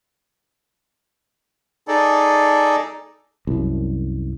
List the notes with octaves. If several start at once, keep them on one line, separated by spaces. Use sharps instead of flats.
D#4 G#4 A4 D5
C2 F#2